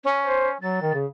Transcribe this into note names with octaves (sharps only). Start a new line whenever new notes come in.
C#4
C5
F#3 A6
D#3
C#3